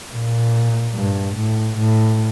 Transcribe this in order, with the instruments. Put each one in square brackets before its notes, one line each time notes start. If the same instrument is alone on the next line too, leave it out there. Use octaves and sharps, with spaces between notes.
[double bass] A#2
G2
A2
A2